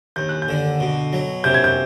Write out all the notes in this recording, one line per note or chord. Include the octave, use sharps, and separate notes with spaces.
D#2 G6
F#6
G6
D3
B2
F#3
C3 G6
G#6
G6